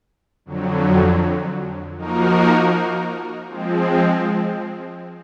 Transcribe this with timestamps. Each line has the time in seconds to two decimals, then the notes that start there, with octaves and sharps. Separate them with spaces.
0.45 F2 D3 F#3
1.96 F3 A#3 D#4 F#4 A#4
3.49 F3 G#3 C4